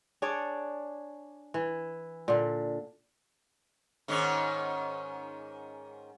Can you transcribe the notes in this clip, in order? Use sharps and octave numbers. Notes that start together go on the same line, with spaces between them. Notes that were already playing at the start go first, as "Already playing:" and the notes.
D4 G#4 C#5 D5
E3
A#2 D3
G#2 D#3 C#4